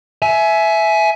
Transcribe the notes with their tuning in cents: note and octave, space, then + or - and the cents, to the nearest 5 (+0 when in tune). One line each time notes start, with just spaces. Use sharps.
E5 +0 G#5 +25